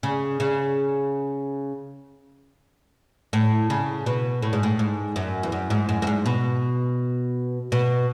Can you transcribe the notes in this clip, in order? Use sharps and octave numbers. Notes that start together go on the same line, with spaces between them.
C#3
C#3
A2
C#3
B2
A2
G#2
A2
G#2
F#2
E2
F#2
G#2
F#2
F#2
G#2
B2
B2